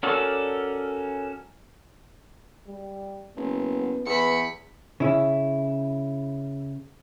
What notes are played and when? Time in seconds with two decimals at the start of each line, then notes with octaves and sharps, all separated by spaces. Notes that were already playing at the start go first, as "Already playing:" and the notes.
0.03 C#4 F#4 A4 A#4 D5
2.67 G3
3.36 F#1 B3
4.06 E2 B4 B5 C#7
5.00 C#3 E4